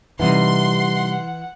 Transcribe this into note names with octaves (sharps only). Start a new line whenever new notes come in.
C3 E3 G3 D#4 F#5 C6 C7